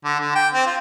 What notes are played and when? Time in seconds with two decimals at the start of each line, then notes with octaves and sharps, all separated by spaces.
0.05 D3
0.20 D3
0.35 G5
0.54 C4
0.66 F4